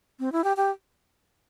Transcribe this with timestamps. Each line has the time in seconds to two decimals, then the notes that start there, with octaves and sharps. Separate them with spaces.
0.20 C4
0.32 E4
0.44 G4
0.57 G4